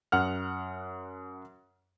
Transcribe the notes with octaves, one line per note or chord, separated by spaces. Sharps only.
F#2 F#5 F6